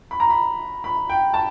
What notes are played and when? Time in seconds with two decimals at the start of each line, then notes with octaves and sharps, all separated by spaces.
0.11 B5
0.20 A#5
0.30 B5
0.84 B5
1.09 G5
1.34 A5